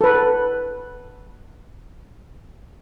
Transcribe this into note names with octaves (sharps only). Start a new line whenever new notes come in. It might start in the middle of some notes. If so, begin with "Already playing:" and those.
A4 B4